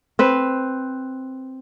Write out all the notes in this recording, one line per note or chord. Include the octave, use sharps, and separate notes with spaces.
C4 B4